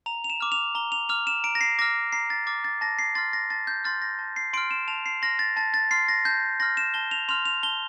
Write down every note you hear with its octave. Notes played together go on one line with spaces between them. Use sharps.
A#5 F7
F7
E7
D6 F6
F7
A#5 G7
F7
D6 F6 F7
E7
A#5 D7
A#6
C7
D6 F6 A#6
A#5 C7
A6
D6 F6 A6
A6
A5 A#6
C7
C6 F6 A6
A#6
A5 A6
G6
C6 F6 A6
A#6
A5
C7
C6 F6 D7
E7
A5 F7
C7
C6 F6 A#6
A6
A5 A6
A6
C6 F6 C7
A#6
A5 G6
C6 F6 A#6
E7
A5 G7
F7
C6 F6 F7
F7
A5 G7